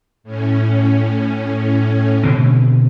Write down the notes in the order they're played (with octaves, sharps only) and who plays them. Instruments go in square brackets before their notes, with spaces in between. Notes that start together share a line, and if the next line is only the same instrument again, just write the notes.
[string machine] A2 C#4
[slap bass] B2 D3 C4